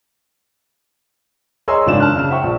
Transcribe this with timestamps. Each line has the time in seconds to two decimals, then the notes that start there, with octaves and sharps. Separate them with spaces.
1.68 G#4 C#5 D#5 A#5 C6 E6
1.86 G#1 F#2 C#3 D4 F4 E7
2.00 A5 F6 F#6
2.15 C#3 F6 E7
2.30 C5 E5 F#5 G5 C#6
2.43 A#1